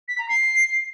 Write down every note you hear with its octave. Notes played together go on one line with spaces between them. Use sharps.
B6
A#5
C7